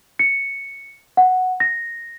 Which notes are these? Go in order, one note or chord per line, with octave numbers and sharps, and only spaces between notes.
C#7
F#5
A#6